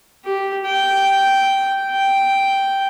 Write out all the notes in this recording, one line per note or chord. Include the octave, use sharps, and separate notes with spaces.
G4
G5
G5